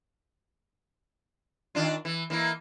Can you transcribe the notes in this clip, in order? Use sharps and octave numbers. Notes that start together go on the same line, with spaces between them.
D#3 D4 F4
E3
E3 A#3 E4